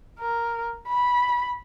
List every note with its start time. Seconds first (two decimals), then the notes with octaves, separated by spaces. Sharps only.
0.19 A#4
0.88 B5